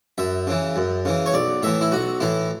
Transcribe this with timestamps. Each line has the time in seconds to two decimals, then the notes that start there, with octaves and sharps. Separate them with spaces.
0.18 F#2 E5
0.47 C#3 E3
0.76 F#2
1.05 C#3 E3
1.26 C#5
1.33 B1 D5
1.63 A2 E3 E5
1.81 E4
1.92 B1 F#4
2.20 A2 E3 E4